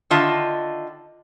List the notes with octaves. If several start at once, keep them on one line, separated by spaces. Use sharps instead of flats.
D3 D#3 F4 D#5 E5 A5